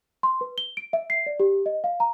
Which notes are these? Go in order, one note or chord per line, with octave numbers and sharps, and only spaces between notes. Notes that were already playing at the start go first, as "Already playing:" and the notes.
C6
B4
G7
D7
E5
C7
D5
G4
D#5
F5
A#5